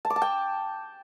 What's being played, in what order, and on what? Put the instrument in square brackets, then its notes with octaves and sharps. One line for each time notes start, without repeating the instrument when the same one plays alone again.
[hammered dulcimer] A5
D6
A5
G5